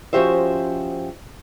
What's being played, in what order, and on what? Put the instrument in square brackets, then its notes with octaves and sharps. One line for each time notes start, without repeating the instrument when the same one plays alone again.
[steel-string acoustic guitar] F3 C#4 F#4 G4 C5 E5